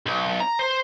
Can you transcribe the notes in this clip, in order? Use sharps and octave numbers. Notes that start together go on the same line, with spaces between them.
B1
A#5
C5